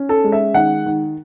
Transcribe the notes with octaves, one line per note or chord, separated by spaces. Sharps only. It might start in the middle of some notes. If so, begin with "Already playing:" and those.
Already playing: C#4
A4
G#3
E5
D#3 F#5
D#3